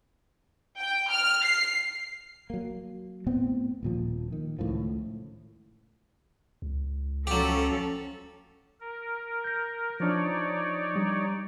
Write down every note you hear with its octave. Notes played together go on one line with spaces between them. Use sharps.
G5
F6
C7
F#3 A#3
A2 B3 C4
D#1 A#2 F3
D#3
C#2 A2 D#3 F3
C#2
F3 F#3 C#4 G4 A4
A#4
G6 A#6
F3 D4 D#4 C#5 D5
G3